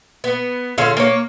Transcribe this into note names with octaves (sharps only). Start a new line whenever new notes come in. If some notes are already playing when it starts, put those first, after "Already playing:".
B3
D3 C#4 F4 G#4
A#3 C#5